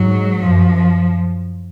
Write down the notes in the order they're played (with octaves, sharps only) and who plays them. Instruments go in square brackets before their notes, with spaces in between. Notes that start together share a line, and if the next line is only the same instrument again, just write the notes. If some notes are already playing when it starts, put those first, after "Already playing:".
Already playing: [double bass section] G#2 [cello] F#3
[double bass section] F#2 [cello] F3